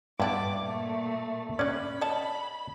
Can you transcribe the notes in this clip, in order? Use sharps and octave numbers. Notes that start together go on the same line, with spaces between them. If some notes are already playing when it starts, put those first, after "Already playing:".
G2 B3 E4 D5 D6
A#2 A3
C#4 D4 D5 B5
C#5 D#5 A5